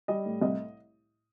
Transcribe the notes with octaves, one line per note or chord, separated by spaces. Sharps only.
G3 D#5
A2
C2 D#5